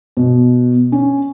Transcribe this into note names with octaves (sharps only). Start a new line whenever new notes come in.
B2
C#4